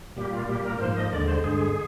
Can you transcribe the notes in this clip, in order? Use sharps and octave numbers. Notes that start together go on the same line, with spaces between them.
A#2 G3 A#3 G4
F4
A#2 G3 A#3 G4
A#4
G#2 F3 A#3 C5
D#5
D#2 D3 G#3 D5
C5
G2 D3 G#3 G#4